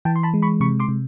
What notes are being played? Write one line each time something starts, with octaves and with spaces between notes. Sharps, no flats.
E3 G5 A5
C6
A5 B5
G#3
B5 C#6
C3 B5 C#6
C6 D6
C3